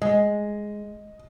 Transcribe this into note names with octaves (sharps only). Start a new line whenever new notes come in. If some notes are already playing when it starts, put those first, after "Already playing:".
G#3 D#5